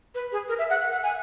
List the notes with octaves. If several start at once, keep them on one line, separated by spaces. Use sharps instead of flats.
B4
G#4
A#4
E5
F#5
F#5
F#5
G#5